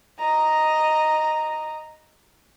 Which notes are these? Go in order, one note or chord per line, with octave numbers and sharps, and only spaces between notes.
D#5 A#5